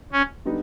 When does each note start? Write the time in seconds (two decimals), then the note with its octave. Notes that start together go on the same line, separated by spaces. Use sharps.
0.12 C#4
0.46 D3 G3 B3 D#4